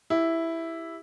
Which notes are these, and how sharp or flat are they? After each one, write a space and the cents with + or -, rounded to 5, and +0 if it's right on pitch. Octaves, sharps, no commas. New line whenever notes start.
E4 +0 G4 +15